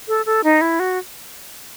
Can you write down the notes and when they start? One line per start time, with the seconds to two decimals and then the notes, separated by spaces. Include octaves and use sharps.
0.08 A4
0.26 A4
0.44 D#4
0.61 E4
0.80 F#4